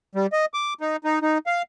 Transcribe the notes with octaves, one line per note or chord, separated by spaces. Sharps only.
G3
D#5
D6
D#4
D#4
D#4
F5